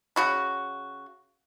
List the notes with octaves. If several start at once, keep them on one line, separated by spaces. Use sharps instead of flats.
C#3 F#4 B5